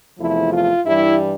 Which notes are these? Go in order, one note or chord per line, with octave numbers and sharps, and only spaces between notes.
E2 C3 F3 A3 E4
F4
G2 E3 G3 E4